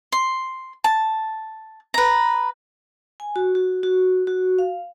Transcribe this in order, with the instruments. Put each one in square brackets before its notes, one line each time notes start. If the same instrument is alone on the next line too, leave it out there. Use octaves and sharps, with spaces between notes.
[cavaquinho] C6
A5
B4 A#5
[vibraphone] G#5
F#4
F#4
F#4
F#4
F5